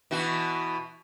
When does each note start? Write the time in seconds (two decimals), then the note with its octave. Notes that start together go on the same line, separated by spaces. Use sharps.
0.11 B2 E3 F#4